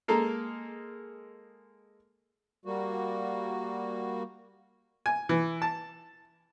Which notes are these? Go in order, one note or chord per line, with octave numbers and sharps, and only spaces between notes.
G#3 A#3 A4 A#4
G3 A#3 F#4
G#5
E3
A5